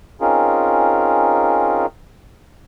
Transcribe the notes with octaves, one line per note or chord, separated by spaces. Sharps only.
C4 C#4 D#4 F4 G#4 A#4